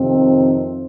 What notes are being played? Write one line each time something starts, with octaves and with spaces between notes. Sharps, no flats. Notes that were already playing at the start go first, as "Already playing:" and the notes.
Already playing: F2 C3 D#3 C4